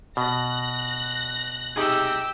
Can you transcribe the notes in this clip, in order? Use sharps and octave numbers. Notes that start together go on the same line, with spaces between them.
B2 F#6 A#6
C3 D#4 G4 G#4 E6